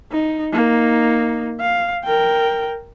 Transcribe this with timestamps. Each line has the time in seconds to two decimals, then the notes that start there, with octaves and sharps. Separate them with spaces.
0.12 D#4
0.53 A#3 D#4
1.60 F5
2.04 A#4 G5